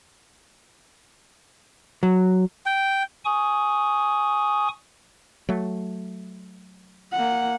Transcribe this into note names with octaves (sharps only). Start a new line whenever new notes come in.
F#3
G5
G#5 C#6 D#6
F#3 A3
A#3 F#5